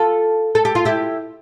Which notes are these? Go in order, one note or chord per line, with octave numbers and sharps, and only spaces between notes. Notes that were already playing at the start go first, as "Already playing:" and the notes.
Already playing: F4 A4
A4
G4
F4
E4 G4